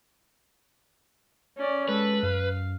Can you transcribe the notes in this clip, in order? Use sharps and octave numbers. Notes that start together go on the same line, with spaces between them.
C#4 D5
G#3 A4 B4
F#2 F5